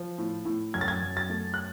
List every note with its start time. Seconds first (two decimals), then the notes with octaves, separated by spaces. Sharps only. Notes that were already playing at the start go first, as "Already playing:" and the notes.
Already playing: F3
0.18 A2
0.45 A2
0.74 F#2 G#6
0.81 A6
0.88 G#6
1.03 F#2
1.17 A6
1.30 A3
1.54 F#6